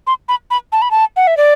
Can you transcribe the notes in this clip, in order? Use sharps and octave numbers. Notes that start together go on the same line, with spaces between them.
C6
B5
B5
A5
B5
A5
F#5
E5
D5